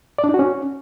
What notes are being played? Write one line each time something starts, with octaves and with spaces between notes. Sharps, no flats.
D5
D4
D#4
F#4
C#4